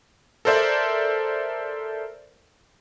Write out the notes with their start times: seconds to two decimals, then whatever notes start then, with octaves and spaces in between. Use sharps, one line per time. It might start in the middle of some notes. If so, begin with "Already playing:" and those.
0.45 A4 A#4 C5 D5 E5